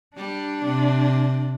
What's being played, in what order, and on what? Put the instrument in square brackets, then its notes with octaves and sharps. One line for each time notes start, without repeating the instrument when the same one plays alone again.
[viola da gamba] G3 [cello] D4
[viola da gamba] C3